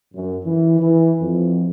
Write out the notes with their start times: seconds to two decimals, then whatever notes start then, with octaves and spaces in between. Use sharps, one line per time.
0.14 F#2
0.44 E3
0.80 E3
1.21 F2